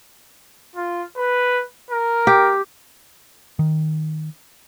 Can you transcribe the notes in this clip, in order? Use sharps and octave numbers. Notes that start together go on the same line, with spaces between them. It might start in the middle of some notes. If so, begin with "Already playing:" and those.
F4
B4
A#4
G4
D#3